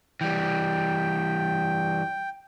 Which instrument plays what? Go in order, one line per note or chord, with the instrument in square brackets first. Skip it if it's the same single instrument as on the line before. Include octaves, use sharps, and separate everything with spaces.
[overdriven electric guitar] E3 G3 [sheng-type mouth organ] G5